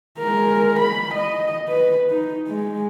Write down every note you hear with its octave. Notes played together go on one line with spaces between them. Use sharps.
G#3 A#4
B5
D#5
B4
D#4
G#3